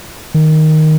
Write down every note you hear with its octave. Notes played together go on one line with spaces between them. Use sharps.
D#3